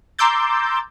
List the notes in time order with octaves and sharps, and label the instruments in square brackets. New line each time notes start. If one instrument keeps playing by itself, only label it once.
[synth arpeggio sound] A#5 C6 D6 E6 G6 A6